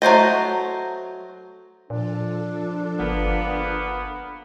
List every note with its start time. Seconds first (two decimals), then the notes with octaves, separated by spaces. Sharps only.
0.02 F#3 A3 C5 D#5
1.90 A#2 F3 D4 F4 A4
2.99 G1 A#3 B3